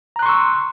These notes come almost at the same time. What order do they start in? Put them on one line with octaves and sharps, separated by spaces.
A#5 F#6 C6 C#6 E6